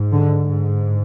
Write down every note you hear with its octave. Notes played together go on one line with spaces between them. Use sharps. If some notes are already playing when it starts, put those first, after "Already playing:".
Already playing: G#2
D3
G#2